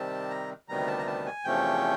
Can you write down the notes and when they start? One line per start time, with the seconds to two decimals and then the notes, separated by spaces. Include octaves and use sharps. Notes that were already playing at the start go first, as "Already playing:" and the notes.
Already playing: C3 D#3 G3 C4 A5
0.30 A#5
0.68 D2 C3 D#3 G3 B3 A#5
0.87 A5
0.99 A#5
1.07 A5
1.26 G#5
1.44 E2 C3 F3 A3 C#4 G5